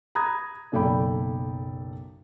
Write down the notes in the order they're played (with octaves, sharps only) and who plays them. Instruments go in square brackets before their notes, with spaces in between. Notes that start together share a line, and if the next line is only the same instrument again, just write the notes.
[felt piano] A#5 B5 D#6 G#6
F#1 B1 A4 D5 G5 B5